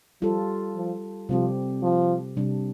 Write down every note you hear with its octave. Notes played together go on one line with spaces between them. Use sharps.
F3 G3 F4 A4
F3
C3 F3 G3 C4 G4
F3
C3 G3 D4